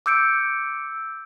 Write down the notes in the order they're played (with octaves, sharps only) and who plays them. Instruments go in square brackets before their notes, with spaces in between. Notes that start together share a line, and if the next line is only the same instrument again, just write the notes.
[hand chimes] D6 E6 G6 C#7 D7